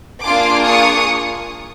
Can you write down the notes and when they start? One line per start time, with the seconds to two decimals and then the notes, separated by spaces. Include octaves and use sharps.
0.24 A#3 D4 F4 G#4 C6 D6
0.65 C#6 D#6